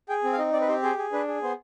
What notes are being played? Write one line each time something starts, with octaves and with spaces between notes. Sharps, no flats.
G#4 G5
C4
F5
D#4 D#5
C4 D5
B4
G4 C5
G#4 C5
G#4
D4 B4
G#4
B3 C5